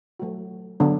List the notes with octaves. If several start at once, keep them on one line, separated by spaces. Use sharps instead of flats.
F#3 A3 F#4
D3 F#3 B3 D4